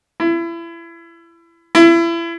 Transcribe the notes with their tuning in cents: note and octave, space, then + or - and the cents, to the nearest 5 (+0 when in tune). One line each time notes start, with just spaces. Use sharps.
E4 +30
E4 +30